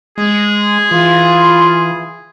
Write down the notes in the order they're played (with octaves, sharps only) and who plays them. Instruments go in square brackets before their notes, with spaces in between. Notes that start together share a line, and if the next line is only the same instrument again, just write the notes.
[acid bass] G#3 [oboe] G#4
[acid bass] E3 [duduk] F4